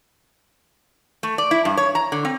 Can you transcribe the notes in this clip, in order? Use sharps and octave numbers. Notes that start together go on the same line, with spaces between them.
A3
D5
E4
G2
C#5
A#5
D3
C4